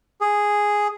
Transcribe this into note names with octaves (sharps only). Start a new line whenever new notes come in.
G#4